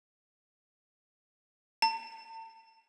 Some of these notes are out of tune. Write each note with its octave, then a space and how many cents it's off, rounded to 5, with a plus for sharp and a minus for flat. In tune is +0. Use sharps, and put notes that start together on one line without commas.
A5 +40